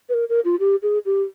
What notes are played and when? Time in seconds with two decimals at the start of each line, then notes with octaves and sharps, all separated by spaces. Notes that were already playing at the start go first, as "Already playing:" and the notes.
0.09 B4
0.14 A#4
0.29 A#4
0.45 F4
0.60 G4
0.82 G#4
1.05 G4